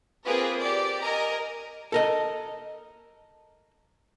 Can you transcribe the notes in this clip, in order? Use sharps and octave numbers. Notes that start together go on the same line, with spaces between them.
A#3 C4 F4 G#4 A#4 B4
G4 D5
A#4 D#5 G#5 A#5
A4 A#4 D#5